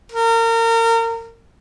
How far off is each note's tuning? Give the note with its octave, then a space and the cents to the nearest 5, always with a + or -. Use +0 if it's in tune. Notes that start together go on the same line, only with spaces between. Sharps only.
A#4 -30